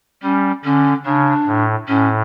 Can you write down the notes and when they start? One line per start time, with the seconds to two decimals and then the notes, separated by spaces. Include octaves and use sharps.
0.23 G3 C#4
0.65 D3 C#4
1.05 C#3 D4
1.47 A2
1.88 A2 C#4